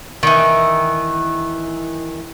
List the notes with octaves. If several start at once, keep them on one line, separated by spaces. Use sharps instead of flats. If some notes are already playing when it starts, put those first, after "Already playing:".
D#3 E3